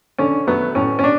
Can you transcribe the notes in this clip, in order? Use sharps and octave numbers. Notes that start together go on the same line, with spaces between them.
D3 C#4
F#3 A3 B3
A2 C#4
C#4
D4